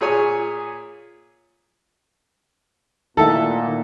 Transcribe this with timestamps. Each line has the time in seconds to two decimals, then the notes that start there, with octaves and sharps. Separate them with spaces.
0.01 A#2 G#4 C#5 G#5
3.17 A#2 D#3 A3 D#4 E4 A4 E5 F#5